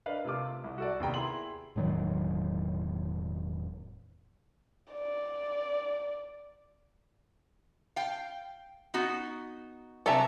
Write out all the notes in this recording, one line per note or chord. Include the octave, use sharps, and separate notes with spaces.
D4 A#4 B4 D#5 F5
C3 A3 F4 D6
C2
F#4 A4 D5
D#2 C3 B3 G5 A#5
E4 G#4 C6 F#7
E1 A2 D#3 F#3
D5
F5 G5
B3 D#4 F#4
C3 F#3 A4 E5 A5 A#5